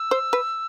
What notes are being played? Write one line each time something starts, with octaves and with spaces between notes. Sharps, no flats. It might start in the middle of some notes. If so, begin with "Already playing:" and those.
Already playing: E6
C5
B4